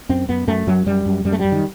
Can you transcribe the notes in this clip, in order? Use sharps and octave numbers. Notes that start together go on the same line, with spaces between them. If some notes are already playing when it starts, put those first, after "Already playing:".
F#2 C4
F#2 B3
F#2 A3
F#2 F#3
F#2 G3
F#2
F#2 G3
A3
F#2 G3
D#3